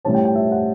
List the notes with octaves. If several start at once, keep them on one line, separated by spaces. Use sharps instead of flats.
A2 G3 C#4 A5
G5
G5
E5
F#5